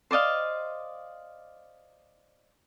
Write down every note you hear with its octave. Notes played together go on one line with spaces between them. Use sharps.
C5 D5 D#5 F5